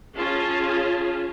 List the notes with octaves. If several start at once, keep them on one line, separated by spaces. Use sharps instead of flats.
C#4 F4 G#4 A5